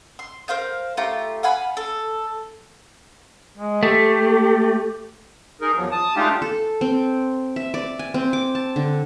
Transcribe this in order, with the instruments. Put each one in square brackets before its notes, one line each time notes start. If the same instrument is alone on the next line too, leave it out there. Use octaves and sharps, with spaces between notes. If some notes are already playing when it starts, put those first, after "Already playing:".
[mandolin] C6
A#4 C5 F5 G6
A3 F4 G4 A#5
F5 F#5 G#5 B5
A4
[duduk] G#3
[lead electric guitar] A3 [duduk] G4
[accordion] D#4 G#4 A#4
E2 F3 F#3
A5 D#6
G#3 A3 D4 D#4 F4 G4
[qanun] A4
C4
E5
D5
G#5
C4
D6
A5
D3